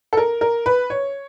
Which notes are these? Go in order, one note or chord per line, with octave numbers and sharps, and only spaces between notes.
A4
A#4
A#4
B4
C#5